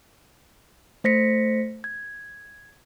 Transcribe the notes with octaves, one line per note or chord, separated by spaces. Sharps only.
A3 C5 A#6 B6 C#7
G#6